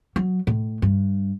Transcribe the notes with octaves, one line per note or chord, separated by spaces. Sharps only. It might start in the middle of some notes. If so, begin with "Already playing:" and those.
F#3
A2
G2